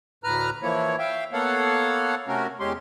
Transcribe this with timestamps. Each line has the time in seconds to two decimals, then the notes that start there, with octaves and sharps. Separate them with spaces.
0.24 D2 A2 B4 A#5 F6
0.63 E3 F3 A#3 E4 C#5
0.99 E5 F5 G5
1.33 A#3 B3 A4 C#5 F5 F#5
2.28 C3 A3 C#4 F#4 A#4
2.60 E2 G#3 C#4 G4 C6